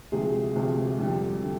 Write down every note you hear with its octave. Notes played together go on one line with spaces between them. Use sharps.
D2 C3 F3 G#3 G#4
D2 C3 F3 G#3
F2 D3 G3
D3